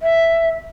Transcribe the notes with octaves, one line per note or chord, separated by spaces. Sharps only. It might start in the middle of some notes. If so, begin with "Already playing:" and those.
E5